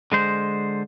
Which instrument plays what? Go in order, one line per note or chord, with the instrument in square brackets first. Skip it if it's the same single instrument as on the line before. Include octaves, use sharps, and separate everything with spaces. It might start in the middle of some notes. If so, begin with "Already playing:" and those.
[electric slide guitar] D3 G#3 C5